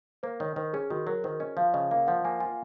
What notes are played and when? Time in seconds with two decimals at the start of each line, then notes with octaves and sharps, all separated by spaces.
0.23 A#3 C5
0.40 D#3 C#5
0.56 D#3 C5
0.73 C#4 G#4
0.90 D#3 F#4
1.07 F#3 A#4
1.24 D#3 C5
1.40 C#4 D#5
1.57 F3 F5
1.73 C#3 D#5
1.91 A#3 F5
2.07 F3 F#5
2.25 A#3 G#5
2.40 F4 G#5